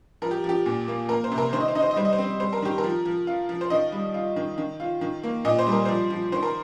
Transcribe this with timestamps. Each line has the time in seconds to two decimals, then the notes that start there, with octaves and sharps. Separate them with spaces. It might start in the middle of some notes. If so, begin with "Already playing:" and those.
0.22 F3 A#4
0.31 G4
0.44 F3
0.49 G4
0.66 A#2
0.88 A#3
1.09 A#3 A#4
1.24 C5
1.31 C3
1.38 A#4
1.53 D#3 C5
1.61 D#5
1.68 C5
1.75 D#4 D#5
1.83 C5
1.91 D#5
1.96 G3 C5
2.05 D#5
2.13 C5
2.18 C4
2.40 G3 C5
2.53 A#4
2.62 D#3 G4
2.78 A#4
2.84 F3
3.05 F3
3.27 F4
3.49 F3
3.61 C5
3.70 D#3 D#5
3.92 G3
4.14 F4
4.36 D#3
4.58 D#3
4.80 F4
5.01 D#3
5.23 A#3
5.45 A#2 D#5
5.59 C5
5.67 G3
5.72 A#4
5.85 F3 C5
6.10 F3
6.32 D#3 C5
6.43 A#4